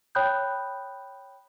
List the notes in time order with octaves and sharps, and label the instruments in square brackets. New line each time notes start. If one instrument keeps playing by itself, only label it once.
[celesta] C#5 G5 B5 D#6 F#6 G6